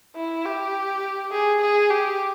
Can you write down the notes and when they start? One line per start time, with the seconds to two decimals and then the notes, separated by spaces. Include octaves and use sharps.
0.16 E4
0.45 G4
1.32 G#4
1.61 G#4
1.90 G4